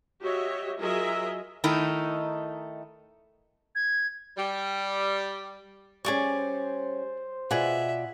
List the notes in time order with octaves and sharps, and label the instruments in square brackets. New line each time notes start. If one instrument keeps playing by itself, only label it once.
[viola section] F#4 G4 C#5 D#5 E5
F#3 F4 G#4 A#4 D#5 E5
[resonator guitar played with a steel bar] D#3 A3 D#4 E4
[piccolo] G#6
[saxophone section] G3
[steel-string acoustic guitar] G3 C#4 [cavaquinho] G#4 D5 C#6 [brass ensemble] C5
[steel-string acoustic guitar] B2 F4 D5 [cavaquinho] G#4 F#5 [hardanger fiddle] E5